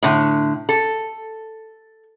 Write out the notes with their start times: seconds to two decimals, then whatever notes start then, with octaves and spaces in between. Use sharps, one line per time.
0.02 A2 D3
0.69 A4